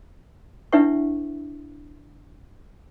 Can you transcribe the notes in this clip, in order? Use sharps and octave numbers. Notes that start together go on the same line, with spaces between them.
D4 E4 B4 E5 F#5 C#6